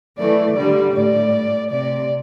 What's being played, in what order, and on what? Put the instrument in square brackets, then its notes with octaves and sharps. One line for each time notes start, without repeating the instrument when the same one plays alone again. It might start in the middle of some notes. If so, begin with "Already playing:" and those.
[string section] E3 A3 [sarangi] D5
[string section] D3 G3 [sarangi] D5
[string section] A2 [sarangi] D5
[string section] C3 [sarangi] D5